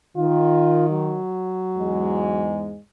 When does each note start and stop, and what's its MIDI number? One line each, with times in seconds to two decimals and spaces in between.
0.16 1.18 51
0.16 0.88 65
0.90 2.53 54
1.76 2.77 40
1.76 2.77 44
1.76 2.77 56